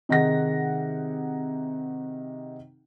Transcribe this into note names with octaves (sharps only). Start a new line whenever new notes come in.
C3 D#3 D#4 G#4 F#5 A#6